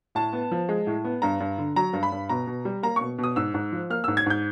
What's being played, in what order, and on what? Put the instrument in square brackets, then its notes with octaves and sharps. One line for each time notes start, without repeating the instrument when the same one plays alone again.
[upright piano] A2 A5
B3
F3
G#3
A2
B3
G2 A#5
G2
D3
F#3 A#5
G2
B5
G2
B2 A#5
B2
G3
A#3 A#5
B2 C#6
B2
D#6
G#2 E6
G#2
F3
A#3 F6
G#2 E6
G#6
G#2 G6